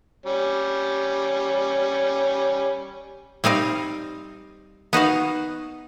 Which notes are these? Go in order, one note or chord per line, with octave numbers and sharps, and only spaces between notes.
G3 C#4
G3 C4 D#4 F5
B3 D#4 F#4 F5